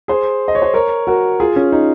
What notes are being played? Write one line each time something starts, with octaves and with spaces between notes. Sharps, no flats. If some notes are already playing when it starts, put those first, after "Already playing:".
G#4 C5
D#5
C#5
C5 D#5
A#4 C#5
F#4 A#4
F4 G#4
C#4 F4
D#4